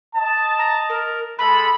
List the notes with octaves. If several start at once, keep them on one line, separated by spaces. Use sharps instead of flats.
D#5 A5
A#5
A#4
G#3 A4 B5